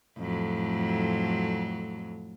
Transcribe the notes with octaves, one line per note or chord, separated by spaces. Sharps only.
F2 A2 F#3